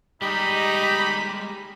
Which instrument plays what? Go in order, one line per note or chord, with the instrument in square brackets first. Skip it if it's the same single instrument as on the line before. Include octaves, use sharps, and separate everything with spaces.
[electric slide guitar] G3 G#3 [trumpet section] D#4 [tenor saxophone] G4 [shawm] B5